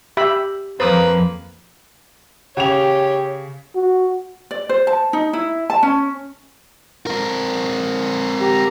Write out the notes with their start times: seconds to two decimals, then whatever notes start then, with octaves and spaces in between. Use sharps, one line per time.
0.17 G4 E5 B5
0.80 F2 F3 A#3 B4 C5 D#6
2.57 C#3 G4 C#5 F7
3.75 F#4
4.51 D5
4.69 C5
4.87 A5
5.13 D#4
5.33 E4
5.70 A5
5.83 C#4
7.07 C4 A#4
8.40 G4 A#5